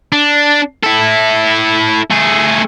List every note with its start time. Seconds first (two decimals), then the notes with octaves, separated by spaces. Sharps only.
0.12 D4
0.83 E4 A4
2.11 A3 G#4